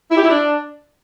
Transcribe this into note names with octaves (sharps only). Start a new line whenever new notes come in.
E4
G4
E4
D4